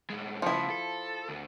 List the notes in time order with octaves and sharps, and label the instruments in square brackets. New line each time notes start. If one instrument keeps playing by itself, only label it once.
[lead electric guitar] A2 G#3
[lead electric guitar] C#3 A3 [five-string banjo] F3 E4
[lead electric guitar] A4
D2